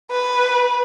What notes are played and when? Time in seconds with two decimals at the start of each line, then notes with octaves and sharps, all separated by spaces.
0.11 B4